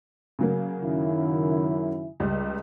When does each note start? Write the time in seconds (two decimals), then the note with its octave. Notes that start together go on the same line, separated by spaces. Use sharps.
0.39 C#3 F#3 A#3
0.82 F#2 D#3 E4
2.20 C#2 G3